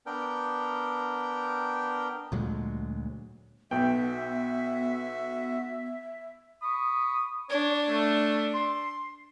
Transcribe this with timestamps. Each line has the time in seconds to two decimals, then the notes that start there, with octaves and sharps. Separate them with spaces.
0.06 B3 D4 A#4 G5
2.32 D2 A#2 F#3 G#3
3.71 B1 B3 F#4 E5 G5
6.61 B5 C#6 D#6
7.50 D4 C#5
7.89 A3
8.54 C6